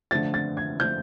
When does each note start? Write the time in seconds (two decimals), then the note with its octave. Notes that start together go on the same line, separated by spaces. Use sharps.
0.11 D3 F3 A3 A6
0.34 A6
0.57 G#6
0.80 D3 F3 A3 G6